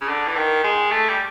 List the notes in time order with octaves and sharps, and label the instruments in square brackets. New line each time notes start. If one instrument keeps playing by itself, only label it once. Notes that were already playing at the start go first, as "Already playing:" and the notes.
[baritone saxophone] C#3
D3
E3
D#3
G#3
A3
G3